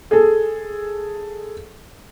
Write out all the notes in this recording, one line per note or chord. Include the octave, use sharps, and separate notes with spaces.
G#4 A4